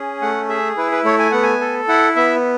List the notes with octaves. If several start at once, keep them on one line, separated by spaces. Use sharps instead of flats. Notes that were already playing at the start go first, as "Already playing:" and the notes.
Already playing: C#4 G#4
A3 F#5
G#4 E5
E4 B4
B4
A3 C#5
G#5
B3 F#5
G#5
A4
E4 F#5
B3 E5